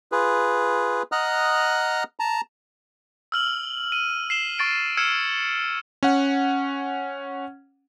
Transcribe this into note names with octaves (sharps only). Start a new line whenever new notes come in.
F4 G#4 B4
D#5 F#5 A#5 D#6 F6 F#6
A5 A#5
E6 F6 F#7
D#7
C7 E7 G7
C#6 A6 D7
E6 F6 G#6 C7 C#7 E7
C#4 F#5